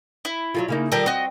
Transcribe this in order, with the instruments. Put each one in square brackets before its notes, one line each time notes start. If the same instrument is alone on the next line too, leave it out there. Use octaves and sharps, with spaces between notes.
[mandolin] E4
[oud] F#3 G#3 F4
C#3 A#3 D#4
[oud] D#3 F3 G3 [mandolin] G4 A4 A#4
[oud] C4 [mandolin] F#4 D#5